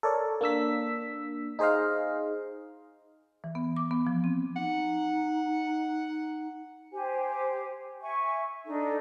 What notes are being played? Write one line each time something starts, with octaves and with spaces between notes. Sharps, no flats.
A4 A#4 C#5 D5
A#3 D4 E6 B6
D#4 G#4 C5 D#5 F5
E3
B3
D6
B3
F3
C4
D#4 F#5
G4 C5 G#5
E5 G#5 C#6
D4 D#4 A4